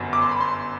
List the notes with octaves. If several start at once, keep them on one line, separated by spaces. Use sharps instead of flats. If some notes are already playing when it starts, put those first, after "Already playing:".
Already playing: G1 F#2 F#3 B3
D6
C6
B5
C6